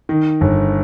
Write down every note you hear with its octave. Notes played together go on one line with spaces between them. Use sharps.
D#3
G1